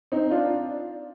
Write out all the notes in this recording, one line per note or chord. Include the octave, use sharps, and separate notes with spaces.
C4 D#4
D4 F4